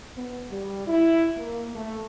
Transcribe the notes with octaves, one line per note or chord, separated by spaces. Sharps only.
B3
G3
E4
A#3
A3